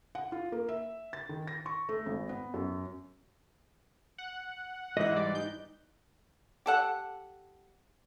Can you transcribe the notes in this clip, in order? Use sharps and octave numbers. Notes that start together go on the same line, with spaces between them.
F#5
F4
A#3
E5
A6
D#3
A#6
C#6
A3
G#1
B3
F#2
F#5
G#2 E3 D#5 E5 F#6
G3 D5
D#4 G6
G4 A4 F#5